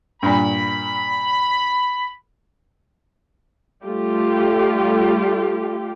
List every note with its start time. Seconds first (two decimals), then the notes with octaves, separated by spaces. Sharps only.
0.23 G2 A#2 B5
3.83 G3 A3 F4 G4